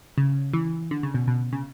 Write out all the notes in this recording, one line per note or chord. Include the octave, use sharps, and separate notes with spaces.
C#3
E3
D3
C#3
B2
B2
C#3